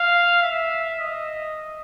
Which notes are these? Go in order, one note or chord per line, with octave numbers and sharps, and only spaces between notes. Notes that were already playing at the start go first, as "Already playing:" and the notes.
Already playing: F5
E5
D#5